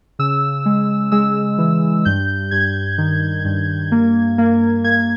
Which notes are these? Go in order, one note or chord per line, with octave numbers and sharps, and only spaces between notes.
C#3 E6
G#3
G#3 E6
E3
G2 G6
G2 G#6
D#3
G2
A#3
A#3
A#3 G#6